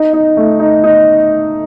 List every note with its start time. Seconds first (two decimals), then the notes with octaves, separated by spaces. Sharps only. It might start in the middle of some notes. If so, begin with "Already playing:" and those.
Already playing: D#4
0.13 D#4
0.37 A3
0.60 D#4
0.84 D#4